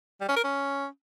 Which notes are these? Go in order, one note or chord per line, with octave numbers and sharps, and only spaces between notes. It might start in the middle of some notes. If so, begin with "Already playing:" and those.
G3
C#4
A#4
C#4